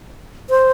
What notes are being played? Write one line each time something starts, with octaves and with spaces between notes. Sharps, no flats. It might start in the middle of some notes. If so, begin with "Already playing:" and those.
C5